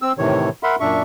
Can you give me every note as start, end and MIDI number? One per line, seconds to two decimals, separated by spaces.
0.02 0.12 60
0.02 0.12 88
0.19 0.49 45
0.19 0.49 48
0.19 0.49 51
0.19 0.49 52
0.19 0.49 73
0.63 0.76 70
0.63 0.76 76
0.63 0.76 78
0.63 0.76 83
0.63 0.76 84
0.80 1.02 42
0.80 1.02 46
0.80 1.02 62
0.80 1.02 76
0.80 1.02 85